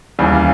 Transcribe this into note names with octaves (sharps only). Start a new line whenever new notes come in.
D#2 C#3 E3 G3